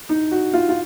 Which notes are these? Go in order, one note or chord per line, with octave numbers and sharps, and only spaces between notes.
D#4
F#4
F4
F4